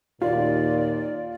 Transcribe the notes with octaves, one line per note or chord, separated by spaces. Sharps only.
D#2 A#2 F4 D5